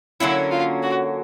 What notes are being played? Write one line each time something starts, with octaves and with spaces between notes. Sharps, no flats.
D3 F#3 A#3 C#4 E4
F4
F#4